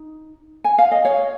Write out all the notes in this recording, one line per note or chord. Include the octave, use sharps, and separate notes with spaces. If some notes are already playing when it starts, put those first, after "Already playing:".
Already playing: D#4
G#5
F5
D#5
C#5 F5